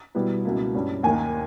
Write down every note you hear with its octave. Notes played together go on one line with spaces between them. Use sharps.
B2 G3 B3 E4
C#2 B2 A#3 E4
G2 G3 C#4
D#2 D#3 A#3 G#5